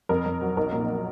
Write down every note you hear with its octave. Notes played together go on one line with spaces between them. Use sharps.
F2 A#4
F2
F#3
B1 A#4
A#2